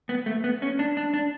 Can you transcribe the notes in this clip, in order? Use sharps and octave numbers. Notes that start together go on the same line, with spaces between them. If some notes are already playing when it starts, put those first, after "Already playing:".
B3
A3
B3
C#4
D4
D4
D4